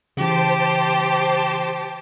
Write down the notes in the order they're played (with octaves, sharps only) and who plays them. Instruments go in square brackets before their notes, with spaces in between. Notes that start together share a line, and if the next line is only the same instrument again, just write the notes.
[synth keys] C#3 E3 [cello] G4 [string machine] C5 A5